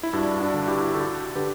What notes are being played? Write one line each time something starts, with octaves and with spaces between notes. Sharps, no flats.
E4
G2 D4 F#4
D4 F#4
D3
E4 G4
D3 F#4 A4
D3 G4 B4